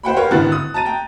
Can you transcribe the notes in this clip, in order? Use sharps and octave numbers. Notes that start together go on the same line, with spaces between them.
C5 F#5 G5 B5
G4 A#4 B4 C#5 F5 F#5
G#1 A2 D3 B4 F#6 A6
D#6
A5 A#5 A6 D#7
G5 A#5